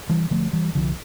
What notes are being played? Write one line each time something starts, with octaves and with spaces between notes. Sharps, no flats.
E3 G3
D3 F3 A3
E3 G3
C2 D3 F3